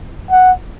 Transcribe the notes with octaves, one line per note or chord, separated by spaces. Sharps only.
F#5